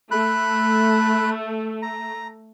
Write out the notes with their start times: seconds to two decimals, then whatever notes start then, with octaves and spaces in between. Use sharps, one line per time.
0.11 A3 B5 F#6
1.82 A#5